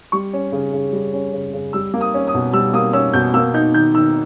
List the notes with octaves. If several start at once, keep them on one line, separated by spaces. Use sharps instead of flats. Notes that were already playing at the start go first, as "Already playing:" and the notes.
G3 C#6
C#4
C#3
C#3
G3
C#4
C#3
C#3
G3 E6
A#3
D#6
C#4
D#6
B2
G3 E6
A#3 D#6
C#4 E6
B2 G6
A#3 E6
D#4 G6
D#3 G6
D#3 E6